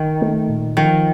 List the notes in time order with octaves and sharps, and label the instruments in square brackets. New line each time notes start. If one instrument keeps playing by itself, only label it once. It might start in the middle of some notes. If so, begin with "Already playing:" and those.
Already playing: [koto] D#3
[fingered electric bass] A3
A#2
[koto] D#3 [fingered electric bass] F3